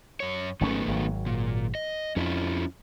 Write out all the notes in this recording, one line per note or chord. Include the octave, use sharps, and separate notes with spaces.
F#2 C#5
G#1 D#3 F#3 A3 B3 C#4
G#1 F#3
A#2
D#5
F2 C#4 E4 F4